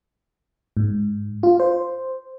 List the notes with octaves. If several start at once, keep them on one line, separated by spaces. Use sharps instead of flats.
G#2
F4
C5